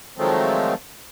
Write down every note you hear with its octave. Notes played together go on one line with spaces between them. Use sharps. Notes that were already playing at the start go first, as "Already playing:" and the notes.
D#3 F3 F#3 G#3 A3 C4